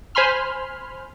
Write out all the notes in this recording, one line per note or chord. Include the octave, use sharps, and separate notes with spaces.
C5 G#5 B5 C6 F6